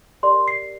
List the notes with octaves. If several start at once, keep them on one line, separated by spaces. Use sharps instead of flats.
G4 A#4 D5 C6
C7